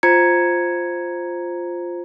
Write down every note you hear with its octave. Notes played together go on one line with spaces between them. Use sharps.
F4 C5 A#5 G#6 C#7